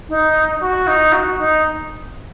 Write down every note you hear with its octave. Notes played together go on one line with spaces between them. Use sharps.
D#4
F#4
D#4
F#4
D#4